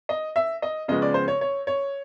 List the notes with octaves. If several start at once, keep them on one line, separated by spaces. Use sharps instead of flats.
D#5
E5
D#5
C#3 F3 G#3 B3 D#5
D5
C5
C#5
C#5
C#5